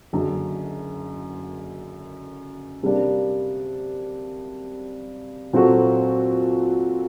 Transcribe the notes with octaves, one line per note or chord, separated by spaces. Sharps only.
F#1 F#2 D3
C3 G3 A#3 D4
A#2 F#3 C4 F#4 A4